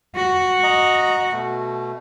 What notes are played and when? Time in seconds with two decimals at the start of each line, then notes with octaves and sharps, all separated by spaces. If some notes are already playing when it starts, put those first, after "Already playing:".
0.15 F#4
0.63 D#5 A#5
1.32 B2 A3